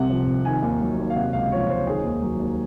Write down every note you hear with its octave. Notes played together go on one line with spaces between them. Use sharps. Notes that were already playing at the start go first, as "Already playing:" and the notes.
Already playing: C2 C3 F#5
F3
C2
D#3 G#5
D#2
F#3
D#2
F5
C3 F#5
C#2 F5
F3 C#5
C#2 C5
D#3 G#4
D#2
F#3
D#2